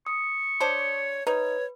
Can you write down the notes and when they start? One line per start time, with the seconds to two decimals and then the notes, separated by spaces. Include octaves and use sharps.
0.07 C#6 D#6
0.60 D4 C5 C#5
1.27 D#4 B4 C#5